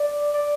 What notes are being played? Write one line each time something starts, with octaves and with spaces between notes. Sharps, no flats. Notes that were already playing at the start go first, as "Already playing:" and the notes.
Already playing: D5
D5